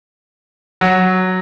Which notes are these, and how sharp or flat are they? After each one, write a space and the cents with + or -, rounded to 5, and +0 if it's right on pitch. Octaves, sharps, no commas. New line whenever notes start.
F#3 +0